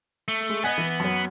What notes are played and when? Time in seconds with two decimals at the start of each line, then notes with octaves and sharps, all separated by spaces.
0.28 A3
0.50 G#3
0.64 B3 D#5 F#5 G#5
0.78 E3
1.00 F#2 F#3